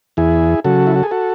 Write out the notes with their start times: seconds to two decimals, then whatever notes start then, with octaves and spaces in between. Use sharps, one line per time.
0.17 E2 E4 G#4
0.64 C#3 F#3 F#4 A4
0.87 E4
0.96 F#4
1.03 G#4
1.11 F#4 A4